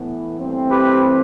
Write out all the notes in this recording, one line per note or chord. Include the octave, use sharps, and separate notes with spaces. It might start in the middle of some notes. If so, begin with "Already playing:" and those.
Already playing: A2 E3 B3
G2 E3 A3 C4
G4 B4